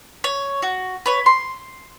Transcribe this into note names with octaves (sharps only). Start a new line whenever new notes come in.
C#5
F#4
B4 C#5
C6